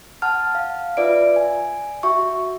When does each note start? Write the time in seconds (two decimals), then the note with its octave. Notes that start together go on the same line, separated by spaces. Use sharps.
0.22 F#5 A5 F6
0.55 F5
0.97 F4 B4 D5 E5 D7
1.36 G#5
2.03 F#4 E5 C#6